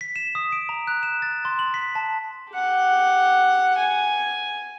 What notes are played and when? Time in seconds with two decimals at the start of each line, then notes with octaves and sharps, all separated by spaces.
0.01 B6
0.16 E7
0.35 D#6
0.52 D7
0.69 A#5
0.87 F#6
1.03 E7
1.22 A6
1.45 C6
1.59 F#7
1.74 B6
1.95 A5
2.53 G4 F#5
3.77 G#5